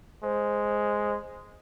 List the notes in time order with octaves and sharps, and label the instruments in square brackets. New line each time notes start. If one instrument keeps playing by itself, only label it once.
[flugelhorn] G#3 [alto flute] C5